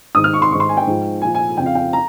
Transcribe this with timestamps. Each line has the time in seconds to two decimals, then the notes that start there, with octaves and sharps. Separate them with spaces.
0.15 G#2 D#3 D#6
0.24 F6
0.34 C#6
0.42 C6
0.51 G#2 D#3 C#6
0.60 C6
0.69 G#5
0.77 G5
0.87 G#2 F3
1.22 A#2 F3 G#5
1.35 G#5
1.57 F2 C#3 F3 G5
1.66 F5
1.75 G5
1.93 A#5